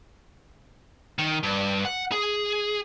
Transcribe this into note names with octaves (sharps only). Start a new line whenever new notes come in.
D#3
G2
F#5
G#4